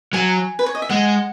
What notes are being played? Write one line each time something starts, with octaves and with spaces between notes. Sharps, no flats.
F#3 G#5
B4
C#5
D#5
E5
G#3 F#5